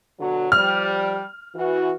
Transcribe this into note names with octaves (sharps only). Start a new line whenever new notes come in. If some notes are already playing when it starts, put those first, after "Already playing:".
B2 D3 F#3
F3 G3 F6
E3 F#4